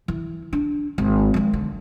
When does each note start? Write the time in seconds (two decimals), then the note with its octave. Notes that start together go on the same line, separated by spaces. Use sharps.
0.08 E3
0.53 D4
0.98 G#1
1.34 F3 G#3
1.53 D3